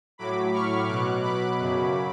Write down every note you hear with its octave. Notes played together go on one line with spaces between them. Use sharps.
A2 F#3 B5 D6
C#6 F6
B2 F#3 D6 F#6
B5 D6
F#2 C#3 F#3